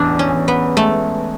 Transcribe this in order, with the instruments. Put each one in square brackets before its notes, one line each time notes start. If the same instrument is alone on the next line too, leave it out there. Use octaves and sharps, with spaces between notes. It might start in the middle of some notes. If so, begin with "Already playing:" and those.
Already playing: [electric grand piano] A1 E2 [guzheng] D4
[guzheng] C#4
[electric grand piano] E2
[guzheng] B3
[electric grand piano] G#3 [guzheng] A3